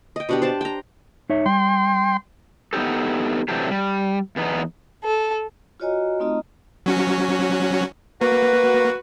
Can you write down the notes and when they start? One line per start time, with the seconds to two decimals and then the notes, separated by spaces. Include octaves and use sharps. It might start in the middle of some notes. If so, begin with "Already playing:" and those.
0.16 D#5 G5
0.29 B2 D4 G4
0.42 C5 D5 A5
0.61 G5 A#5
1.30 D#4 C#5 E5
1.46 G3 G5 C6
2.73 B3 D#4 F4 G4 A4
3.48 C3 E3 F#3 A3 D4 G4
3.71 G3
4.36 E2 B3 D#4
5.04 A4
5.80 F4 F#4 C#5 D#5 G#5 A#5
6.20 A3 C4 D#4 F4 D#5 A#5
6.86 F#3 C#4 F#4
8.21 A#3 F#4 B4